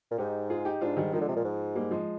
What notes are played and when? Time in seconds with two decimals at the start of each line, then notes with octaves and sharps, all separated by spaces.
0.11 A#2
0.18 G#2 D#4 G4
0.50 F4 G#4
0.65 D#4 G4
0.81 G#2 D4 F4
0.97 D#3 G3
1.13 D#3 F3 G#3
1.21 D3
1.29 C3
1.37 A#2
1.45 G#2
1.75 G3 A#3
1.91 F3 G#3